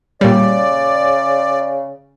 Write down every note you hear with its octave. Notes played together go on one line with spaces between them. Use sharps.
A#2 C#3 G3 D5